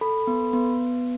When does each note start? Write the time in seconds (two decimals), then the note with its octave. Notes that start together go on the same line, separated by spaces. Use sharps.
0.01 A4 B5
0.27 B3
0.53 B3